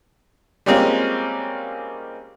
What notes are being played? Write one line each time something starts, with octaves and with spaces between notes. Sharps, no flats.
G3 G#3 A#3 C4 C#4 F4